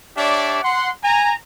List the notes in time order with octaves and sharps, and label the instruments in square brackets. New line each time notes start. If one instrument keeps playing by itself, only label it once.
[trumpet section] D4 G4 C#5 D5 E5
F#5 C6
G#5 A#5